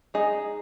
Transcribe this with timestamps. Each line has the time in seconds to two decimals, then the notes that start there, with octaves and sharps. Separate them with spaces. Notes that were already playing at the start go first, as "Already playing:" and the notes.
0.14 G#3 D#4 G#4 D#5